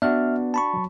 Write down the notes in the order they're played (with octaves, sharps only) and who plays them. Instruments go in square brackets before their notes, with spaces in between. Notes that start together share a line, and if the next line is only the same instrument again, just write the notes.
[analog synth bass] B3 [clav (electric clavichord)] D4 F#4 [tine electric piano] E5 F6
[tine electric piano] A5 B5 C#6
[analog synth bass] F#3